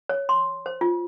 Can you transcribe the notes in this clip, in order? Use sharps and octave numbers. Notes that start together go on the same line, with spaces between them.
C#5
C6
C5
F4